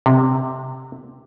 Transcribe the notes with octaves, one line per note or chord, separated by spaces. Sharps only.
C3